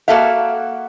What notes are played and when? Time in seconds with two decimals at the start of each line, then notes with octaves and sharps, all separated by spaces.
0.08 A#3 F#4 A4 E5 F5